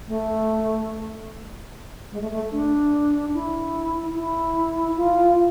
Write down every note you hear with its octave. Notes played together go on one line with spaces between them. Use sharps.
A3
G#3
A3
A3
D4
E4
E4
F4